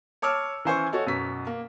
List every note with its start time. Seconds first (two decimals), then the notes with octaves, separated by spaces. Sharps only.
0.22 C#5 A5 D6 E6 F6
0.65 E3 C#4 C5 G#5 C6 C#6
0.92 F#4 A4 C#5 D#5
1.07 F#2 B2 B6
1.47 A#3